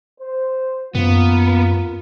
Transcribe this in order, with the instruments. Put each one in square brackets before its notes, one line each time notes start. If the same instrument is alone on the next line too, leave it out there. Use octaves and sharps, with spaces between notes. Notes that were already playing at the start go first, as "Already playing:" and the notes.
[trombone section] C5
[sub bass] F#2 [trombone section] A#3 F4 [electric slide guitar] B3